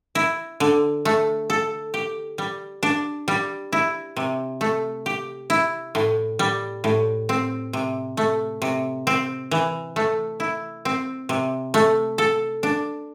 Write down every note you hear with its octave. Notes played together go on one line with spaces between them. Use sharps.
E4
D3
A3
A4
G4
G3
D4
G3
E4
C3
A3
G4
E4
A2
G3
A2
C4
C3
A3
C3
C4
E3
A3
E4
C4
C3
A3
A4
D4